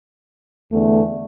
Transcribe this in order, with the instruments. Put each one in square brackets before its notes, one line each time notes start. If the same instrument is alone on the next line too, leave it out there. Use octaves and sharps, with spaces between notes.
[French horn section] E2 D3 A3